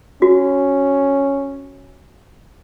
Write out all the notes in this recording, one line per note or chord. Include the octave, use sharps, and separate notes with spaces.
C#4 F#4